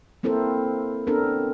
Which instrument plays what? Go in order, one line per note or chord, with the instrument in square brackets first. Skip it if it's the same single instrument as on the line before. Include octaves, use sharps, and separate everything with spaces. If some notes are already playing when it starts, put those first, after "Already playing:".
[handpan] A#3 C4 E4 A4 A#4 C5
B3 C4 D4 A4 A#4